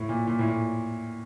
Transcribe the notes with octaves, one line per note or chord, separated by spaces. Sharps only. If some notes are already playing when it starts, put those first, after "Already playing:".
Already playing: A2
A#2
A#2
A2
A#2